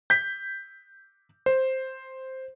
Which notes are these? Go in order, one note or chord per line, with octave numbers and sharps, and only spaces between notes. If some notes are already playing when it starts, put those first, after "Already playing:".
G6 B6
C5